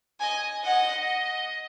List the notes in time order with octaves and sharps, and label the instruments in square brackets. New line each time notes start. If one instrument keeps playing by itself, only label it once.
[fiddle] D#5 [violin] G#5
[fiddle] D#5 [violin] F#5